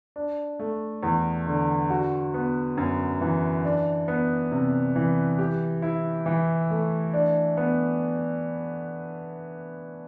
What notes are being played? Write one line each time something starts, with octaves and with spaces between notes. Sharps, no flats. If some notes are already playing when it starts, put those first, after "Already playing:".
D4
A3
E2
D3
F#4
B3
F#2
E3
D4
B3
C3
E3
G4
E4
E3
A3
D4
B3